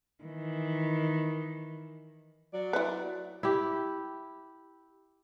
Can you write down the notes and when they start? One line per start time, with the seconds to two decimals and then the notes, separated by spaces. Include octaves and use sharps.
0.23 D#3 E3
2.53 F#3 D5
2.73 E4 B4
3.43 E4 G4